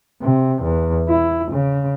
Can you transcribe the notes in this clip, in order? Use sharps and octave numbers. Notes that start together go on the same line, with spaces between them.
C3
E2
E4
C#3